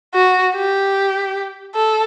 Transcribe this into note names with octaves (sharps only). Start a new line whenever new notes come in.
F#4
G4
A4